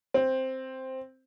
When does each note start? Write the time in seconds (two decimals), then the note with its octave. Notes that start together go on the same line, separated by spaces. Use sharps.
0.14 C4